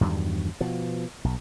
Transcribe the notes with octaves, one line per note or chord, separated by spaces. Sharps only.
E2 G2 D#3 F#3
B2 F3
B1